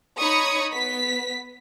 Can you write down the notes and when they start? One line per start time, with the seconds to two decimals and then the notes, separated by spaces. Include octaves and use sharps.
0.19 D#4 C#5 B5 C#6 D#6
0.73 B3 B6